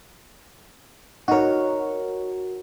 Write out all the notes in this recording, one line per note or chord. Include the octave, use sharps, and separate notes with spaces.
D#4 F#4 A#4 C#5